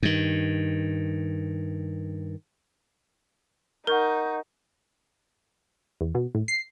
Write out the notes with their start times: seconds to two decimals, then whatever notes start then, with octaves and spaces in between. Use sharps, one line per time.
0.03 G2 D#3
3.87 D#4 A#4 F#5 C#6 G6
6.01 E2
6.15 B2
6.35 A2
6.48 C7